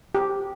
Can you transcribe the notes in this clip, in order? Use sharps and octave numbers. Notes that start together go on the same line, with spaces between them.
G4